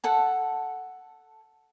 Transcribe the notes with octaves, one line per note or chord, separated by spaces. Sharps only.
A4 F#5 A5